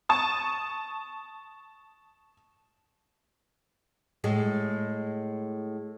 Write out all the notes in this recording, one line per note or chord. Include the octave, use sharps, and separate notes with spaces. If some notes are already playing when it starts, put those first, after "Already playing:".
A5 C#6 D#6
A2 G#3 G#4